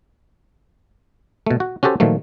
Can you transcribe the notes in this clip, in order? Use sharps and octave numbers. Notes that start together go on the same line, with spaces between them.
B2 A3
F#4
C#4 F#4 G4 A4 C5
A#2 D#3 F3 F#3 A3